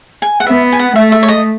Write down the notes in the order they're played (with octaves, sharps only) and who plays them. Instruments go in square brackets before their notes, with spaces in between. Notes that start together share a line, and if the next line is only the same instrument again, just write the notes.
[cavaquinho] G#5
F#5
[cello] B3 [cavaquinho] E5
[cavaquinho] G#5
F#5
[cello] A3 [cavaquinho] E5
[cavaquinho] E5
C#5
D#5